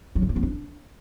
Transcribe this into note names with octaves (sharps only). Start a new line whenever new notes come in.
F#3
D3
A#3
B3
D4